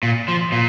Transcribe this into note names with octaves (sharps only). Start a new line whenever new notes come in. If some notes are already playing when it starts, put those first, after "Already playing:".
A#2
F3
A#2